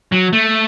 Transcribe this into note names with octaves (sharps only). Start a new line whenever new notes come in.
F#3
A3